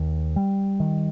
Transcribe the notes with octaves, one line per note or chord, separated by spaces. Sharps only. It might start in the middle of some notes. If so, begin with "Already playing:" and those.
Already playing: D#2
G3
D#3